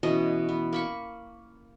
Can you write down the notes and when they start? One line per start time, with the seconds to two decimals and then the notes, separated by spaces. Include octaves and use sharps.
0.03 B2 E3 C#4 D#5
0.49 B3
0.73 A#3 B5 C#6